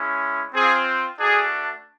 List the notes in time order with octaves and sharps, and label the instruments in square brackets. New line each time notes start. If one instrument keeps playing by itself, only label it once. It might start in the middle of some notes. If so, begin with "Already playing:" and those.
Already playing: [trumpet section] G#3 C#4 E4
C4 F4 G#4
A3 D4 F#4 G#4